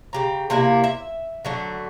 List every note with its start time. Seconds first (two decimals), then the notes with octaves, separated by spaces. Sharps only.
0.13 C#3 G4 A#5
0.50 C3 A#3 D4 E4
0.84 E5
1.45 D3 F#3 A3